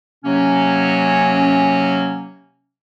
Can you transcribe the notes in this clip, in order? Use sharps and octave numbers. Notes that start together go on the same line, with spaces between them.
C3 F#3 A#3 C#4